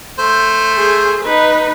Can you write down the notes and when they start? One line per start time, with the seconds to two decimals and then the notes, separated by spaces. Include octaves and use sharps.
0.19 A3 C5
0.78 G#4
1.24 D#4 B4